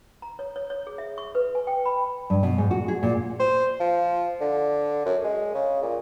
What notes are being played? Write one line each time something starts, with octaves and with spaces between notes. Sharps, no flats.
A#5
C#5
C#5
C#5
G#4
E5
C#6
B4
G#5
G5
B5
G2
B2
G#2
F#4
G#4
A#2
C5
F3
D3
F#2
G#3
C#3
A#2